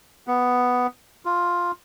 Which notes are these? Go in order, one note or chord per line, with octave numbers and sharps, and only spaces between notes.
B3
F4